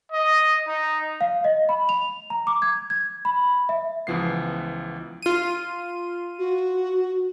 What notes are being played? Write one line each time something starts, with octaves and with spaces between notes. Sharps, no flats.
D#5
D#4
F5
D#5
B5
F7
A#5
D6
G#6
G#6
B5
E5
C#2 E3 F3 B3 C7
F4 D#7
F#4